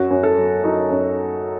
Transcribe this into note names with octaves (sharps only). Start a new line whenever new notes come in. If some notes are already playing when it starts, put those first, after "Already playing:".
Already playing: F#2 F#4
F#2
A4
F#3
F#3 D#4
F#2